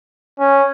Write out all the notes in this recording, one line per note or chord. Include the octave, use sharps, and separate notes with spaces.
C#4